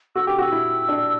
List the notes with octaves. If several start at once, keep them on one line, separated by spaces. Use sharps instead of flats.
F#4 E6
G4 D6
F#4
E6
E4
D4